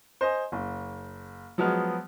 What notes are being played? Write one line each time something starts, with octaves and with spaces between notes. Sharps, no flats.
C5 D#5 G#5
F#1
F3 F#3 G#3 B3 F6